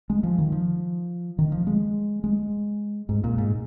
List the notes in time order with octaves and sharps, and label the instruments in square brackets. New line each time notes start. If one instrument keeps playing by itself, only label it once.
[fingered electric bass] G#3
F3
D#3
F3
D#3
F3
G#3
G#3
G#2
A#2
G#2